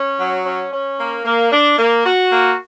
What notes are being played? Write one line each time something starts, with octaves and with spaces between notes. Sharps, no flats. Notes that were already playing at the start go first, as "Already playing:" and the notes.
Already playing: C#4
F#3
C#4
C#4
A#3
A#3
D4
A#3
F#4
A#3